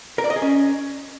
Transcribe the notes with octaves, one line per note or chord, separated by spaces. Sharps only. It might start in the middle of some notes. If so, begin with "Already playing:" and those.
A#4
D5
D#5
G#4
C#4